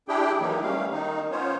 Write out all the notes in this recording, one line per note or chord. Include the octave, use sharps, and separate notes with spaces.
D4 E4 G4 G#4 G5
D#3 E3 F#3 A#3 D#4
G3 A3 C#4 F5
D#3 D#4
B3 C#4 F4 C5 C#5